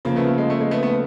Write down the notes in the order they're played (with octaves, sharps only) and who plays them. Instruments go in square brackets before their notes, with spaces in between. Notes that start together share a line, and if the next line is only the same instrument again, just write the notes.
[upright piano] C#3 F3 A#3
[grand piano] A3 B3
A3
G#3
A3
G#3
A3 B3
A3 B3